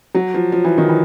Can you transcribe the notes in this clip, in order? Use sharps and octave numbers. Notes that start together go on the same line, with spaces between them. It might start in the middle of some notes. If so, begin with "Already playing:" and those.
F#3
F3
F3
E3
D#3
E3